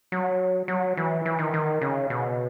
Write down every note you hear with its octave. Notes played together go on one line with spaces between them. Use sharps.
F#3
F#3
E3
E3
D#3
D#3
C#3
B2